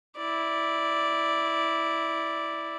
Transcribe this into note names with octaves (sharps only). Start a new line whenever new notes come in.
E4 D5